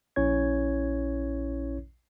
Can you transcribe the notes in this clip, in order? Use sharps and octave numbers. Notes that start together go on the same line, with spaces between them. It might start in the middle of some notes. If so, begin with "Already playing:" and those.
A#1 C#4 E4 C#5 G#6